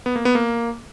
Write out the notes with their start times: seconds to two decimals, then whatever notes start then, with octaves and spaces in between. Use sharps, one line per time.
0.06 B3
0.16 A#3
0.25 B3
0.35 A#3